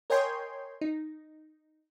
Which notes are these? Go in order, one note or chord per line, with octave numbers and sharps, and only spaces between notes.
A#4 C#5 D#5 G5 G#5 C6
D#4